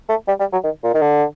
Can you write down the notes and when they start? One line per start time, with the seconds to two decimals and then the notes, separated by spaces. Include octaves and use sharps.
0.09 A3
0.28 G3
0.40 G3
0.53 F#3
0.64 D#3
0.84 A#2
0.94 D#3
1.01 D3